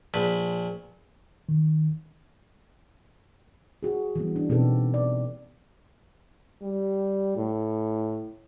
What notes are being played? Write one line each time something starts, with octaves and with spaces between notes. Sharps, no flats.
A#1 B4
D#3
F#4 G#4
E3 G3 B3
D4
B2 B3 C4 D#4 G4 A4
D5
G3
A2